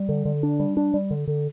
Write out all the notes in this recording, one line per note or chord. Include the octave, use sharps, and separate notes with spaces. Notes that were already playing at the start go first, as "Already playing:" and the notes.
Already playing: G3
D3
D3
D4
G3
D4
G3
D3
D3